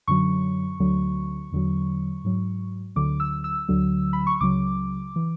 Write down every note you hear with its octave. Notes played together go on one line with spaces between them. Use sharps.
F#2 D3 F#3 C#6
D2 D3 F#3
E2 D3 F#3
G#2 F#3
D2 D3 F#3 D6
E6
E6
D2 D3 F#3
B5
C#6
C#2 C#3 F#3 D6
E3